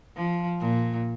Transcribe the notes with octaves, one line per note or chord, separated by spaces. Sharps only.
F3
A#2